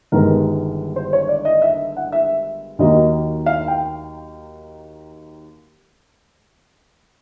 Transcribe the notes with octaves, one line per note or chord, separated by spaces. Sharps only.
G1 G2 D#3 G#3 B3 A#4
C5
C#5
D5
D#5
E5
F#5
E5
D#2 D#3 F#3 A#3 D#5
F5
G5